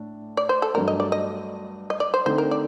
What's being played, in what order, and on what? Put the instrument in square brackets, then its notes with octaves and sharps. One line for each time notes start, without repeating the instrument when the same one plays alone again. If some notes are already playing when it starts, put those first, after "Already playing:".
Already playing: [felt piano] A2 D4
[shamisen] D5
C5
A4
[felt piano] G2 F#3 A3 D4 [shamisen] A#4
[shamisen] D#5
D5
D#5
D#5
D5
C5
[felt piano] D3 A3 C4 D#4 [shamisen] C5
[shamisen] A#4
D5